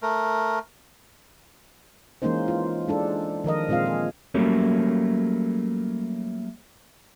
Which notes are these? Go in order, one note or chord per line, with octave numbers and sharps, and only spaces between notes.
A3 A#4
E3 G#3 A#3 C#4 D#4 C5
F4
G#3 D4 A4
D#3 F3 A#4 D#5
A#2 G#3 C4 F4 F5
G#4
F#3 G3 A3 A#3 C#4